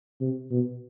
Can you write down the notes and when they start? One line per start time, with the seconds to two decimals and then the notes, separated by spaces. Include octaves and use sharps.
0.21 C3
0.50 B2